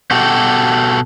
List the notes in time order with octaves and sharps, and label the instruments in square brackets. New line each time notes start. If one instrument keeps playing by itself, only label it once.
[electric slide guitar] B2 F#4 G4 A4